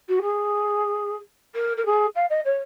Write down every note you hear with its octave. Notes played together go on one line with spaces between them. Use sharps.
F#4
G#4
A#4
A#4
G#4
F5
D#5
C#5